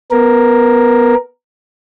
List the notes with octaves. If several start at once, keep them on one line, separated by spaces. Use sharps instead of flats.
B3 A#4